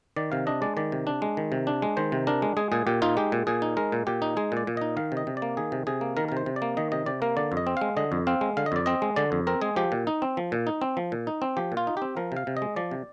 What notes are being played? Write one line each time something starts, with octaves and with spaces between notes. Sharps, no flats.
D#3 D5
C3 F5
D4 D#5
G#3 D5
D#3 D5
C3
D4
G#3
D#3
C3
D4
G#3
D#3 C5
C3
D4 A#4
G#3
G#3 G#4
A#2 G#4
A#2 G4
D#4 F4
G#3 G4
A#2
A#2 G#4
D#4
G#3 A#4
A#2
A#2 G4
D#4
G#3 G#4
A#2 D5
A#2
D#4 D#5
D#3 F5
C3
D#5
C3
D5
A#3
D#3 G#4
C3
C3 G#4
A#3
D#3 A#4
A#4
C3
C5
C3
D5
A#3
D#3 D#5
C3 D#5
C3 D5
A#3 A#4
D3 D5
F2
D#5
C4
G#3 F5
D3 D#5
F2
C4 F5
G#3
D3 F5
D#5
F2 D5
C4 D#5
G#3
D3 D5
F2
C4 A#4
G#3 G#4
F3 G4
A#2
D#4
C4
F3
A#2
D#4
C4
F3
A#2
D#4
C4
F3 G4
A#2
F4
D#4
C4 G4
F3 A#4
C3 F5
C3
D#5
G#3
F3 D5
C3